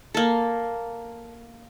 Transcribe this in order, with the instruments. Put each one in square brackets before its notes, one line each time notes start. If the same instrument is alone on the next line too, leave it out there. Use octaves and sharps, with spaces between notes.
[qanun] A#3 A4